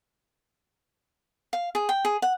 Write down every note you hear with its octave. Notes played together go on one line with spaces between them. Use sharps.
F5
G#4
G5
G#4
F#5